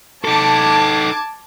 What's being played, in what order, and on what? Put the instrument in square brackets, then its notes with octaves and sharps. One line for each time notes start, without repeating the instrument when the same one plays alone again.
[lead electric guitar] D#4 A4 [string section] A5 D6 G#6